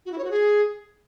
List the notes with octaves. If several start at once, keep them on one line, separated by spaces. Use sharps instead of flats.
F#4
E4
C#5
F#4
G#4